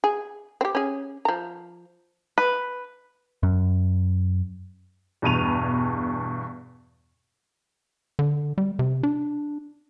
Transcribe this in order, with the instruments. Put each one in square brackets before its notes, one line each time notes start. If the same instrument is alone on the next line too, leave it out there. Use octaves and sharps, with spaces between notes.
[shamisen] G#4
C4 G4
C#4 G#4
F3 A#5
[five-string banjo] B4
[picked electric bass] F#2
[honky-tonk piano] E2 G2 B2 D#7 F7
[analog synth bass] D3
G3
C3
D4